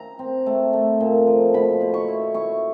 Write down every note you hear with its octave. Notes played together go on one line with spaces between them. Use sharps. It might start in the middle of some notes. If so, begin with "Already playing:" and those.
Already playing: A#5
C4
A3
A3
A#2
F3
B2 B5
B2
C#6
E4
E4 C#6